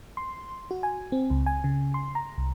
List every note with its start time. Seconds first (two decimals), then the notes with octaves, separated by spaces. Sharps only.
0.17 C6
0.71 F#4
0.83 G#5
1.12 C4
1.30 C#2
1.46 G#5
1.64 C#3
1.94 C6
2.15 A#5
2.38 C2